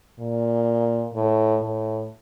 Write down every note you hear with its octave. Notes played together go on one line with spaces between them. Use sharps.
A#2
A2
A2